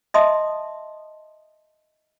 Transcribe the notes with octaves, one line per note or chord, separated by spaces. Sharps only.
D#5 E5 A5 C6 D#6